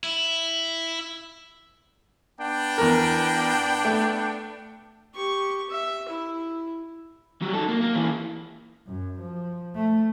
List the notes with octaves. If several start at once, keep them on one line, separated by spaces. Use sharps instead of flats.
E4
B3 D4 G5
E2 A#4
A3
G4 C#6
E5
E4
F#3 G3
D#3 A4
A#3
A#3
A#2 E3
F#2
F3
A3